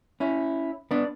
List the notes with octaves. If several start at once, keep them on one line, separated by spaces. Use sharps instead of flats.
C#4 E4
B3 D4